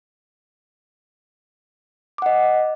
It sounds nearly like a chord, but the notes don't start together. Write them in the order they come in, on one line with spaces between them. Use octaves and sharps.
D6 F#5 D#5